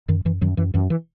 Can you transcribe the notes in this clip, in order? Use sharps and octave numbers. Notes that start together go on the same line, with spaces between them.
F#2 D#3
F#2 E3
F#2 D#3 F#3
F#2 E3
F#2 E3
E3